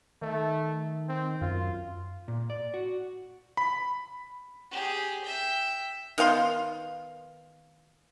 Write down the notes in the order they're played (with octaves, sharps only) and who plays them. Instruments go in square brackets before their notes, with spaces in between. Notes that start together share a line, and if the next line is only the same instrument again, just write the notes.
[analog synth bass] D#3 [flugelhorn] A3
[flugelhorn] C4
[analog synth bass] F#2 [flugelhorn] F4
[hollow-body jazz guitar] A#2
D5
F#4
[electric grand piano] B5
[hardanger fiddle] G4 G#4
E5 G5
[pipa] D#3 B3 F5 C6